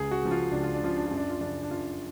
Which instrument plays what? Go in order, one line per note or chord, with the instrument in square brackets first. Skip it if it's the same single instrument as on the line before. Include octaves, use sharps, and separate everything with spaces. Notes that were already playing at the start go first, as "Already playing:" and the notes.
Already playing: [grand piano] C#2 G#4
F#4
C#3 F3
F4
C#2 D4
F4
D4
C#3 F3 F4
D4
F#2 F4
D4
F4
C#3 F3 D4
D4
F#2 F4